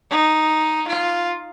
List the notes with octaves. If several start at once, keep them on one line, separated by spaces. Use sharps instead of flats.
D#4
F4